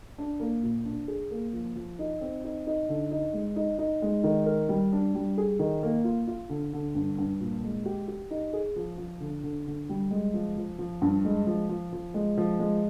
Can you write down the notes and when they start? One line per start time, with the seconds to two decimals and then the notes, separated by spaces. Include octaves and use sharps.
0.18 D4
0.40 A#3
0.63 A#2
0.85 D4
1.08 G#4
1.31 A#3
1.53 F3
1.75 F3
1.99 D#4
2.21 C4
2.44 D#4
2.67 D#4
2.89 D3
3.11 D#4
3.33 G#3
3.56 D#4
3.78 D#4
4.02 G#3
4.24 D#3
4.46 A#4
4.69 G3
4.92 D4
5.15 G3
5.38 G#4
5.59 D#3
5.83 A#3
6.04 F4
6.27 F4
6.49 D3
6.73 D3
6.95 G2
7.18 G2
7.40 A#2
7.64 G#3
7.85 G4
8.08 G4
8.31 D#4
8.53 G#4
8.76 F3
8.98 F3
9.20 D3
9.43 D3
9.67 D3
9.89 G3
10.11 G#3
10.34 F3
10.56 F3
10.79 F3
11.02 G2
11.25 G#3
11.47 F3
11.69 F3
11.93 F3
12.14 G#3
12.37 F3
12.59 G#3